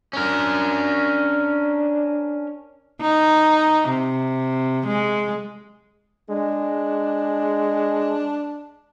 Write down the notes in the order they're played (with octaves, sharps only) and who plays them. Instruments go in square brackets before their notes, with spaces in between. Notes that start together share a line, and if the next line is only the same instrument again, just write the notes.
[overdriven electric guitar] C#4 A#4 [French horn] D4
[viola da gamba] D#4
C3
G#3
[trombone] G#3 [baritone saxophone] D4